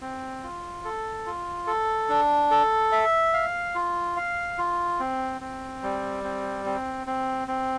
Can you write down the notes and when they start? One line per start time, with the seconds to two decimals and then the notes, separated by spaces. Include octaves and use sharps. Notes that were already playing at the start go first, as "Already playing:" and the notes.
0.01 C4
0.43 F4
0.85 A4
1.26 F4
1.67 A4
2.09 D4
2.51 A4
2.92 E5
3.34 F5
3.75 F4
4.16 F5
4.58 F4
5.00 C4
5.41 C4
5.83 G3
6.24 C4
6.66 C4
7.07 C4
7.48 C4